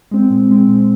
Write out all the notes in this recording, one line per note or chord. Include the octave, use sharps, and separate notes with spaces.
G#3 C4
A#2
G#3 C4
A#2